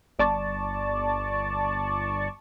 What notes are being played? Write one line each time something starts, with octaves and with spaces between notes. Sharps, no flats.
G1 D5 A5 C#6